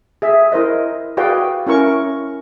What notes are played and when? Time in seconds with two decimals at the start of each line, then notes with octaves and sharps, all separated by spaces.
0.22 G#4 E5
0.52 E4 A#4 C5 D#5
1.17 F#4 G#4 B4 D5 F5 G5
1.67 C#4 E4 A#4 C#6